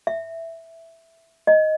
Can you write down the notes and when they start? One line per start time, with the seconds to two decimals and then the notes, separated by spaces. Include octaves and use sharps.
0.07 E5
1.47 D#5